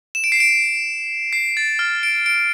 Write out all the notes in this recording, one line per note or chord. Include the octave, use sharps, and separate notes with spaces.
E7
D7
C7
D7
C7
A6
F6
D7
D7